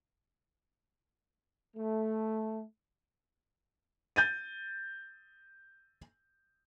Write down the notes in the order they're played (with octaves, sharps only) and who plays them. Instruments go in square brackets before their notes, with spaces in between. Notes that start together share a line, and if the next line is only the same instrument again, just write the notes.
[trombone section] A3
[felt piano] G6 A6 D#7